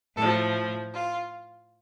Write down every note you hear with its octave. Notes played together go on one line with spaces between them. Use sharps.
A2 F3 A4
F4